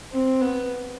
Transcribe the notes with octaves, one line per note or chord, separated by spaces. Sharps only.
C4
B3